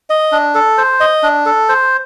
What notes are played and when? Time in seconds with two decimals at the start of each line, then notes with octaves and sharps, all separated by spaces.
0.10 D#5
0.32 D4
0.55 A4
0.78 C5
1.00 D#5
1.23 D4
1.46 A4
1.69 C5